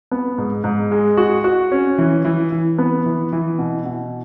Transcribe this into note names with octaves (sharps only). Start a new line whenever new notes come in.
B3
G#2
G#2
G#3
F#4
F#4
C#4
E3
E3
E3
B3
E3
E3
B2
B2